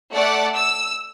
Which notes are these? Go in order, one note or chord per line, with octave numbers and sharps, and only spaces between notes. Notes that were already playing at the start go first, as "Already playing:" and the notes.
A3 D5 F#5
E6